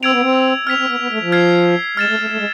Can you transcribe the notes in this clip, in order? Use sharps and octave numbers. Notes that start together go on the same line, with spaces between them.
C4 E6 G#6 D7 F7
B3
C4
C4 F6 G#6 B6 F7
C4
B3
B3
A3
F3
F6 G#6 C7
G#3 F6 A6 E7
A3
A3
A3
G#3